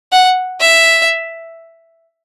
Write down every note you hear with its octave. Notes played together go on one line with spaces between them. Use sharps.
F#5
E5